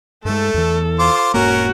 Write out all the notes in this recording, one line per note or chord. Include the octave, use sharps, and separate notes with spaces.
G2 G#3 A3 A4
E2 E3
F4 C5 D6
E1 G#2 A#3 C#4 F#4 A#4